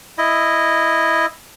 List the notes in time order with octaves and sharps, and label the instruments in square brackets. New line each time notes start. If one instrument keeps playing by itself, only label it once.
[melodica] E4 D#5